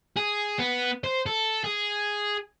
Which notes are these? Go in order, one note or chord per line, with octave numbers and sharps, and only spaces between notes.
G#4
B3
C5
A4
G#4